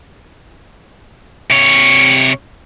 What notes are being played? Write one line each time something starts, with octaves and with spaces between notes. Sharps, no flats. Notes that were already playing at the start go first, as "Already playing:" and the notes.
C3 C#5